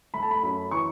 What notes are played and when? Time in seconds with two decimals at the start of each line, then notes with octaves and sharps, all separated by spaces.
0.14 A3 B5
0.22 A5
0.31 B5
0.43 F#2 B5
0.71 E3 C#6